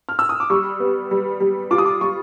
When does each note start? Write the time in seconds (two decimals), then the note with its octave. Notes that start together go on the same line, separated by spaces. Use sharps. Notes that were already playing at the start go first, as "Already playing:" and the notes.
0.09 F6
0.19 E6
0.29 D#6
0.40 D6
0.50 G3 C#6
0.80 B3
1.11 G3
1.40 G3
1.71 F4 D6
1.78 D#6
1.85 D6
2.01 G3 C#6